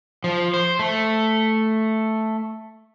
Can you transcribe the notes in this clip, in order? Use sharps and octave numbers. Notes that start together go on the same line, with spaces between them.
F3
C5
A3